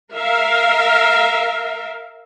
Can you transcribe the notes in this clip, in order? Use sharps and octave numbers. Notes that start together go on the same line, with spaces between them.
A#4 E5 F5